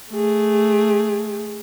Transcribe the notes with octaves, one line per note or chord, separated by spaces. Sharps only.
A3 G#4